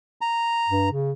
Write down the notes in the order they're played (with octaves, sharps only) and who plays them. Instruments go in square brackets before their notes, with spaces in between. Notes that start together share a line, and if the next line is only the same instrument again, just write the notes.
[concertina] A#5
[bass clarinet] G2
C#3